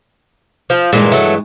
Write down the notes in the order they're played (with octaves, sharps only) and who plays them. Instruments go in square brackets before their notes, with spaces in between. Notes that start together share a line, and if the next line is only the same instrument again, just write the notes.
[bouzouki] F3
[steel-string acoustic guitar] G2 E3 G#3 [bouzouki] A#2
[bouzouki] F#3 A3